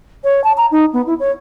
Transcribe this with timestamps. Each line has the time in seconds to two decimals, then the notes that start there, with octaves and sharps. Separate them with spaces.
0.24 C#5
0.44 A5
0.57 A#5
0.72 D#4
0.93 B3
1.07 E4
1.20 C#5